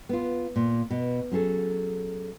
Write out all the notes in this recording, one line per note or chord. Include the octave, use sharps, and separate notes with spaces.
B3 F4
A#2
B2
F#3 C#4 G#4 A4